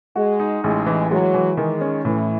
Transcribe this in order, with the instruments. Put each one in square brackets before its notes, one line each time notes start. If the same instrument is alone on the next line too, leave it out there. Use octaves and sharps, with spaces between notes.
[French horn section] G#3 [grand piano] F#4
[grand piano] D#4
[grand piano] A1 [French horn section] G#3
[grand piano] E3
[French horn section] F#3 [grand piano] G#3
[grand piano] E3
[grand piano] D#3 [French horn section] G#3
[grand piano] C#4
[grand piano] A2 [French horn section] E3